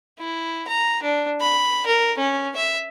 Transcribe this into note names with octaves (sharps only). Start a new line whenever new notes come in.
E4
A#5
D4
B5
A#4
C#4
E5